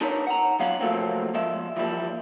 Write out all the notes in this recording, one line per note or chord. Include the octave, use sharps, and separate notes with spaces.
D4 D#4 A#4 B4 C#5
F#5 A#5
F#3 B3 C#4 F4 F5 F#5
C3 F3 F#3 A3 A#3 C4
F3 G#3 E5
E3 F3 G3 A#3 E4